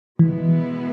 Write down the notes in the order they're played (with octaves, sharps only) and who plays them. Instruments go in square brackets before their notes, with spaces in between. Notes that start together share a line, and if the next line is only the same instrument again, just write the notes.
[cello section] B2 G#3 B3 E4 [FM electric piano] E3